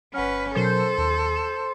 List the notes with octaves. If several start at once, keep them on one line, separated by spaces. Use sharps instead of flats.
G1 C#4 B4 F#5 F6
B2 F#3 A4 A#4 C5
D#2
E7